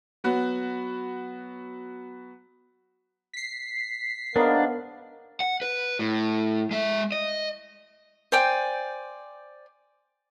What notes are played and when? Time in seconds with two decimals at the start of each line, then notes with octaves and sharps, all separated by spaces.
0.24 F#3 B3 F#4
3.34 B6 C7
4.36 G#2 A#3 B3 D4 A#4 C#5
5.40 F#5
5.62 B4
5.99 A2
6.71 G#3 E5
7.12 D#5
8.32 C5 D5 G5 G#5